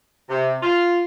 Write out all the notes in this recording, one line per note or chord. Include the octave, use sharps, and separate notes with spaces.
C3
F4